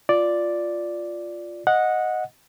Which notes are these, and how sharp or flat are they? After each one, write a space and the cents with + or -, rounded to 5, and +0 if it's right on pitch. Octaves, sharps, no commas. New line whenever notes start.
F4 +0 D5 +0
D#5 +0 F#5 -15